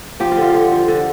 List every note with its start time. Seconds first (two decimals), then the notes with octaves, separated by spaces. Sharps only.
0.20 F3 G4
0.32 F4
0.37 D3
0.43 F4
0.54 D3
0.72 F3
0.88 D3